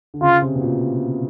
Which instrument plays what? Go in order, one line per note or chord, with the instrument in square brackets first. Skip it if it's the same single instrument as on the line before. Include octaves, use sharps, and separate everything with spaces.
[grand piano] D3
[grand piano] C#3 [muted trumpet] F4
[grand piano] C3
B2
A#2